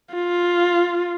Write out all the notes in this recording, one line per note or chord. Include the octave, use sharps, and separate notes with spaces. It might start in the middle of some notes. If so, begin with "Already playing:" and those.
F4